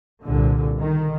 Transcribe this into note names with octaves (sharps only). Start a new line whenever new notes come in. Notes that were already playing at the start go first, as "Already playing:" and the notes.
C2 A#2 D3
D#3